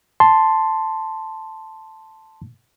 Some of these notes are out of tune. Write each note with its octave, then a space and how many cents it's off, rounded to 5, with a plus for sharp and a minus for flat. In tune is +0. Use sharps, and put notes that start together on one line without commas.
A5 +0 C6 +0